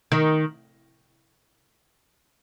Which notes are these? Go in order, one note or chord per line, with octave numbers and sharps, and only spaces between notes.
D#3